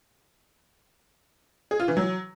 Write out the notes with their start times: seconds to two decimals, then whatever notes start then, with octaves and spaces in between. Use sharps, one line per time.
1.71 G#4
1.80 F4
1.88 E3
1.97 F#3